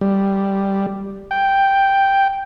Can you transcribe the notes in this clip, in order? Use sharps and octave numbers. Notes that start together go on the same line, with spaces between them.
G3
G5